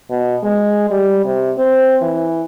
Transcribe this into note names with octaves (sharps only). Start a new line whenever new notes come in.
B2
G#3
G3
C3
C4
E3